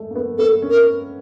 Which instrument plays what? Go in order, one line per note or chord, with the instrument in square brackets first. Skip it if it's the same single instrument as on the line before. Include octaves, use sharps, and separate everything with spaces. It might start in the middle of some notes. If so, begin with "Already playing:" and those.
Already playing: [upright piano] G#3 A3
A#3
B3
[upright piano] B3 [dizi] A4
[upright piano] C#4
[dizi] A#4